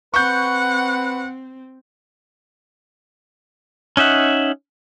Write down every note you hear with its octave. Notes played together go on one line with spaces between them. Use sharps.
C4 B4 F#5 C#6 G6
C#4 D#4 E5 F#5